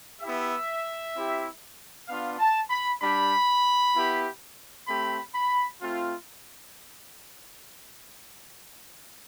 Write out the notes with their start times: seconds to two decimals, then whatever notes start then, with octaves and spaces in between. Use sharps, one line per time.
0.21 B3 E4 G4 E5
1.15 C4 E4 G4
2.08 B3 D4 F4 F5
2.39 A5
2.70 B5
3.01 G3 D4 G4 B5
3.95 B3 E4 G4
4.87 A3 C4 G4 B5
5.34 B5
5.81 A3 C4 F4